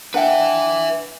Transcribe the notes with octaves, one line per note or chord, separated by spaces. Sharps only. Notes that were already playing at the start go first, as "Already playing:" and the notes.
D4 B4 E5 F#5 G5